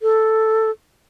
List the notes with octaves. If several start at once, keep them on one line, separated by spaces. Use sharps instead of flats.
A4